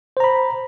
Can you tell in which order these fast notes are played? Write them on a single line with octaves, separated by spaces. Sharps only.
C5 A#5 B5